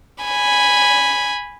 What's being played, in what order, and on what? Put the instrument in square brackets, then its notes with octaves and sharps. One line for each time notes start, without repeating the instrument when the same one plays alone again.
[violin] G#5 B5